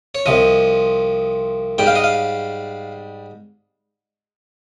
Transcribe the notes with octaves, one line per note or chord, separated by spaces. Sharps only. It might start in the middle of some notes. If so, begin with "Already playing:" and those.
C#5
C2 C3 F3 D#5
G#2 G3 G5
F5
D#5
F5